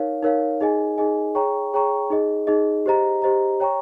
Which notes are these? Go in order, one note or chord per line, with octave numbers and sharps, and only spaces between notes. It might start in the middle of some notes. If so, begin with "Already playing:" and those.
Already playing: D#4 A#4 C#5 F5
D#4 A#4 C#5 F5
D#4 G#4 D#5 G#5
D#4 G#4 D#5 G#5
G#4 C#5 G5 A#5 C#6
G#4 C#5 G5 A#5 C#6
D#4 G#4 D#5
D#4 G#4 D#5
G4 C5 D#5 A#5
G4 C5 D#5 A#5
C#5 G5 A#5 C#6